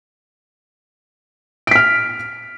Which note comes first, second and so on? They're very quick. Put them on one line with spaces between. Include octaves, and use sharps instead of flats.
D7 B6 F6